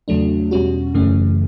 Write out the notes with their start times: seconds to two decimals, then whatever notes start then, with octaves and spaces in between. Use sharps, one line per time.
0.08 E2 C#3 F#3 A3 D4
0.51 E2 B2 G3 C#4 F#4
0.94 F#2 C#3 E3 A3 C#4